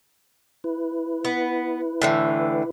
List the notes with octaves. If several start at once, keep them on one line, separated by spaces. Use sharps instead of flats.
E4 B4
B3
A2 D3 E3